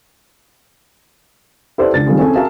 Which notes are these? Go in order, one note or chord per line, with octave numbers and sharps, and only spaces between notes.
E4 G4 A4 B4 C5 D5
C#2 D4 A6
D#3 G3 A3 C4 F4 G#4
C4 C#4 E4 G#4 A4 G#5
F#4 G#4 A#4 E5 A5